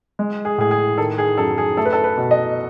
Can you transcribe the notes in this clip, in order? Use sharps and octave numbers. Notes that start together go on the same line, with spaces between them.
G#3
G#4
A2 G#4
G#4
D#3 A4
G#4
F#2 A4
G#4
A3 A4
B4
A4
B4
B2
D#5